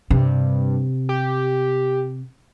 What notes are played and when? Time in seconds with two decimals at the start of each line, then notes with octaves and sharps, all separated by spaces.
0.10 G2 C3
1.09 G4